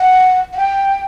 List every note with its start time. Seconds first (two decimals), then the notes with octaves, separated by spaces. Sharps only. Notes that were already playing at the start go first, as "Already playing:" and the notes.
Already playing: F#5
0.53 F#5
0.57 G5